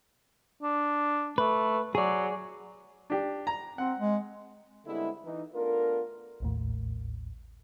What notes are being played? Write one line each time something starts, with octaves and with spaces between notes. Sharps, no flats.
D4
A3 B4
F#3 G#4 D5
D4 G4
A#5
C4 F#5
G#3
D3 G3 G#3 B3 C4 E4
E3 D#4
A3 B3 D4 F4 A#4
A1 D#2 A2